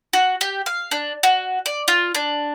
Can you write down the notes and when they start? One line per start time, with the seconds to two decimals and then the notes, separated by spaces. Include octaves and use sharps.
0.13 F#4
0.41 G4
0.66 F5
0.91 D4
1.23 F#4
1.66 D5
1.88 F4
2.15 D4